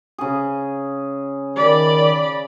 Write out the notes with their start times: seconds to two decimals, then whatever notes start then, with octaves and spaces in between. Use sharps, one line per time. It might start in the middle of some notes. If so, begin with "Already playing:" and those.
0.18 C#3 G#4
1.56 D#3 D5 B5